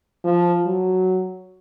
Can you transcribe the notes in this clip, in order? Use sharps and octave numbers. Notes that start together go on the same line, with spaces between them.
F3
F#3